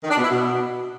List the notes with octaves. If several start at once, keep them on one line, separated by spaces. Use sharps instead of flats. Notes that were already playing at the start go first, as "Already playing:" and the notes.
D#3
D4
B2
E4
B2